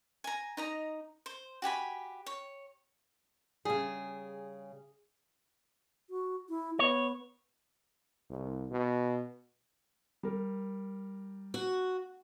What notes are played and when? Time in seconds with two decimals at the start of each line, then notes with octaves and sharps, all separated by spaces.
0.24 G#5 A#5
0.57 D#4 D#5 A#5
1.26 C5
1.62 F#4 G4 G#5 B5
2.26 C#5
3.65 C#3 G3 G#4
6.10 F#4
6.49 E4
6.79 B3 C#5
8.30 C2
8.70 B2
10.23 G3 A#4
11.54 F#4